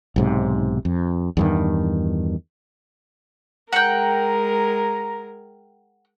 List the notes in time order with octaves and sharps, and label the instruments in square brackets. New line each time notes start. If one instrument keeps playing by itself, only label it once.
[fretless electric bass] B1 G#2 C3
F2
E2 G2 D#3
[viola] G#3 A#4 [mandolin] F#5 G5 [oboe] A#5